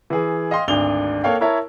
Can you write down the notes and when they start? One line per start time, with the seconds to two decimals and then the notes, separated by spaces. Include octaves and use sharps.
0.10 E3 G#4
0.51 D#5 F5 G5 C6
0.68 G#1 D2 D4 F7 G7
1.24 A#3 A4 C#5 F5 G5
1.41 E4 A#4 C#5 E5 A5